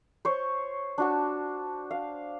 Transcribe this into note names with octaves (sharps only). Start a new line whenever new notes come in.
C5 C#5
D4 F#4 A5
F5